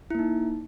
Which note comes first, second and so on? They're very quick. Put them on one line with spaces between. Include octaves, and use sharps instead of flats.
E4 A#3 D#4